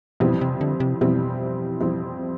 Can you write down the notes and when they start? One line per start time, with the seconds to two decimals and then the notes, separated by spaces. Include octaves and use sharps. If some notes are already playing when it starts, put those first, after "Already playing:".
0.20 F2 B2 E3 G3 C4
0.41 C3
0.61 D3
0.80 C3
1.01 F2 B2 E3 G3 C4
1.81 F2 E3 G3 C4